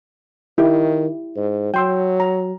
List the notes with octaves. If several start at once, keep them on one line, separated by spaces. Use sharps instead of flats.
D#3 E4 G4
G#2
F#3 G5 C6 E6
A#5